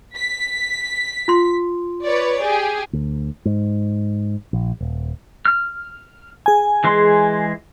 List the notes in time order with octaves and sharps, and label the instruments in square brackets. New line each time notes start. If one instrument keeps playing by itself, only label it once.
[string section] B6
[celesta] F4 C6
[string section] B4 C#5 D5
G4 G#4
[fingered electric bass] D2
G#2
A#1
D#1
[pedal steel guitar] F6
[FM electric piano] G#4 G#5
[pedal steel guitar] E3 G#3 C6